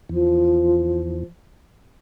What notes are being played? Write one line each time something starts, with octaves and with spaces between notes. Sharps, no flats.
E2 F3